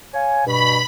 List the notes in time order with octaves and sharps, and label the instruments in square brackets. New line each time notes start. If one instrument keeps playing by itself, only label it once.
[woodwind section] C#5 F5 G#5
[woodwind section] G2 B2 [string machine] B5